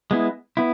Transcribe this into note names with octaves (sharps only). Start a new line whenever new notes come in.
G#3 B3 E4
B3 E4